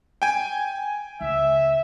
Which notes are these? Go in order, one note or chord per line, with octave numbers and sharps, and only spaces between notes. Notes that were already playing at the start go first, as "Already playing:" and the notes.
G5 G#5
C#2 E5